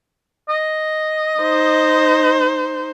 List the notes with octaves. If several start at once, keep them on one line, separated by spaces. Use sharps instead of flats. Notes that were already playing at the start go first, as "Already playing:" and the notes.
D#5
D#4 C5